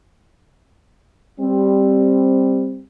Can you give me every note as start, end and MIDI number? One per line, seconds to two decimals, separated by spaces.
1.40 2.82 55
1.40 2.82 60